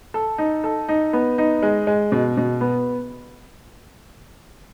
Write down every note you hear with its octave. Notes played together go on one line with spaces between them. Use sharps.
A4
D#4
A4
D#4
B3
D#4
G#3
G#3
B2
B2
B3